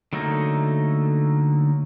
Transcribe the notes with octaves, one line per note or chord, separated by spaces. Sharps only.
D3 F#3 A3 A#3 D#4